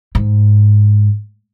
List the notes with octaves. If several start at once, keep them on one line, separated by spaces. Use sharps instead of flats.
G#2